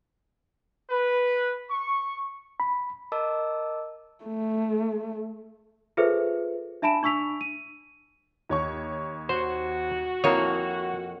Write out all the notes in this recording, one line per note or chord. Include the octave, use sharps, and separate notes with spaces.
B4
C#6
B5
A#4 D#5 A5 D6 E6
A3
F4 G#4 A4 B4 C5 E5
D4 E5 A5 B5 D7 E7
D4 C#6 E6 B6 F7
D#7
D#2 C#5 C#6
F#4 C5
F2 A#3 E4 C#5